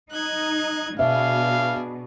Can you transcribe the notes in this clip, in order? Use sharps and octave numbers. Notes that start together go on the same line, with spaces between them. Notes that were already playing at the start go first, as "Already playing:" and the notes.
D#4 F#6 G#6
B2 D4 G#4 E5 F5